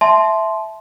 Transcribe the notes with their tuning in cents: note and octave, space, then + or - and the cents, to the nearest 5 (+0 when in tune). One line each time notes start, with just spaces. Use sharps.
E5 +0 A5 -25 C6 +0